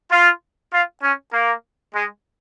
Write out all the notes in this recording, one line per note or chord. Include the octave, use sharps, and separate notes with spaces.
F4
F4
C#4
A#3
G#3